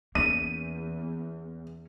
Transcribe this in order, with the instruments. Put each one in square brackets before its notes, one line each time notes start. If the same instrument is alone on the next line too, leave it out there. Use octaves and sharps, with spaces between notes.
[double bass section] E2 [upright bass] A#3 C#4 [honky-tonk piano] D#7